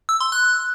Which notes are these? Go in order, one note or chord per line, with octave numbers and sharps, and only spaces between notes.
E6
C6
F#6